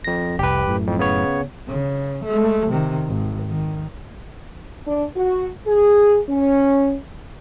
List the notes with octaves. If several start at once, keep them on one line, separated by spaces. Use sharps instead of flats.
F2 A#6
F1 C2 G4 B4
F#2 A2
F2
C#3 B3 C#5
C#3
G#3 A3
C3 D#3
G#1
D#3
D4
F#4
G#4
C#4